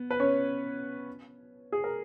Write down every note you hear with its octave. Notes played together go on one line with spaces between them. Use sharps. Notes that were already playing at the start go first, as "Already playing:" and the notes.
Already playing: B3
B4
C#4 C#5
G#4
A#4